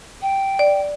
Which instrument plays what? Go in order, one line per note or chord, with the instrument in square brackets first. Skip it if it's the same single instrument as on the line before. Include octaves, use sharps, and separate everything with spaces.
[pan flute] G5
[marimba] D5